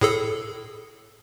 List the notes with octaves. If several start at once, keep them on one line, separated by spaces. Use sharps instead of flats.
A2 G#4 A4